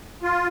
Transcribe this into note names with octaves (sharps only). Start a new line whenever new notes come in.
F4